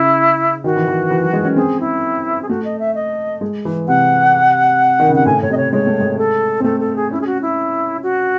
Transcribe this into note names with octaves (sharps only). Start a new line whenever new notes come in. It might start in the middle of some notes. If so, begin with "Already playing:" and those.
Already playing: C#3 E4
D#3 F#4
E3
E3
E3
F#3
G#3
C#4
C4 G#4
E4
G#4
A3 F#4
D#5
E5
D#5
G#3
E3
C3 F#5
D#3
C#3
C3 F#5
A2 G#5
A2 C#5
C3 D#5
C#5
G#3 C#5
A3
G#3
A4
C4
A3 A4
A4
G#4
C#4 E4
G#4
F#4
E4
F#4